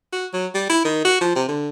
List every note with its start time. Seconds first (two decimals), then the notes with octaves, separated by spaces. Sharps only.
0.13 F#4
0.33 F#3
0.55 G3
0.69 E4
0.85 D#3
1.05 F#4
1.21 F3
1.36 C3
1.49 D3